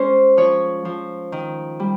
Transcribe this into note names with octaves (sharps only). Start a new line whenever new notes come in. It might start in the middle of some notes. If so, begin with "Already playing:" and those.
Already playing: G#3 C#4 C5
F3 C#5
F3
D#3
G3